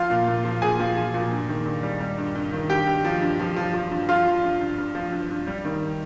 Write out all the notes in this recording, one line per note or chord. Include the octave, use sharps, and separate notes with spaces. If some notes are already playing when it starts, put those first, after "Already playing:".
Already playing: F3 F4 F5
A#2
A#2
F3
A#2 G#4 G#5
F3
F3
A#2
G2
D#3
G2
G3
G3
G2
G2
D#3
G2 G4 G5
G2
F3
G2
F3
F3
F3
G2
F3 F4 F5
F3
G2
G2
G2
F3
G2
G2
G3
D#3